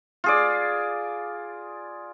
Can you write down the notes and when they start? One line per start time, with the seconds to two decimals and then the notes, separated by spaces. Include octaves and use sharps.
0.24 F4 G#4 D5